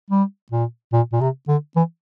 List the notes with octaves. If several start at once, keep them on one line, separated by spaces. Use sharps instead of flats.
G3
A#2
A#2
A#2
C3
D3
E3